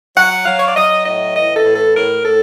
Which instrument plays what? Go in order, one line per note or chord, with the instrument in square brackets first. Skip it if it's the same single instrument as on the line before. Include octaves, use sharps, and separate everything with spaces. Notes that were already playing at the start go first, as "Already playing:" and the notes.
[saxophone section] F#3 F#5
F#3 F5
C#5
D5
F#3 D#5
A2 D#5
E3 D#5
A4
A2
A4
A2 A#4
A2 A4